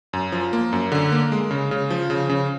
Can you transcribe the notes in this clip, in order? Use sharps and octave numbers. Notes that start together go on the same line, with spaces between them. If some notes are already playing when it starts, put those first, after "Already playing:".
F#2
F3
A#3
F#2
D3
A#3
G#3
C#3
C#3
F3
C#3
C#3